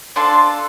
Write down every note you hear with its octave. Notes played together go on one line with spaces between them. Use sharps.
D4 F4 A4 C6